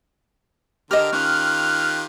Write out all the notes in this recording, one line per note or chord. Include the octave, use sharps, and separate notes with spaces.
D3 G4 A#4 D#5 F6
D#3 C#4 F4 G4 F#6